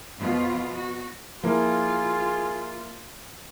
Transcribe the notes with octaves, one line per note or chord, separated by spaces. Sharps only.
F2 B2 B3 F4
F#4
F3 A#3 E4 F4 G#4